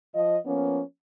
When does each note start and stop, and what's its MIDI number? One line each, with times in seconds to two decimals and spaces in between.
0.15 0.37 53
0.15 0.37 75
0.46 0.82 53
0.46 0.82 58
0.46 0.82 59
0.46 0.82 61